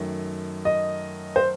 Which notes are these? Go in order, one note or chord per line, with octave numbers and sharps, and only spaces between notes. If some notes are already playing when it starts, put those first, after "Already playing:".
Already playing: F#2 D#3 A3
D#5
C5